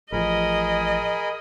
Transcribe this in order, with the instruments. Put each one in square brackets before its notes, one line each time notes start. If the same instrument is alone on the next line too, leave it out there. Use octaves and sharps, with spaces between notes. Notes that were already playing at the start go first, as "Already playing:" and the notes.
[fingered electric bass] A1 F3 [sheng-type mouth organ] G#4 A#4 B5 [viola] D#5